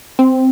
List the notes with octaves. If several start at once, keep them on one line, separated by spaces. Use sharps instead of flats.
C4